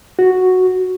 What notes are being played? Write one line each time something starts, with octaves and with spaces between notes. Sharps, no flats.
F#4